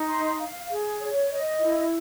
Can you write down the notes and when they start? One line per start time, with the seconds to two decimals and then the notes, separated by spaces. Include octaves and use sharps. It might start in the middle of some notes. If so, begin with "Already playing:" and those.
Already playing: D#4
0.10 C6
0.40 F5
0.70 G#4
1.00 C#5
1.31 D#5
1.61 E4